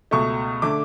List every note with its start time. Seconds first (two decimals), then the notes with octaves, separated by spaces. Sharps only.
0.11 C#2 B2 A3 C#6
0.62 D3 A3 D6